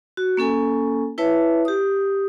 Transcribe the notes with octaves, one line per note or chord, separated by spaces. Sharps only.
F#4
A#3 C#4 A4 G#5
E4 B4 C#5 E5 A5
G4 D#6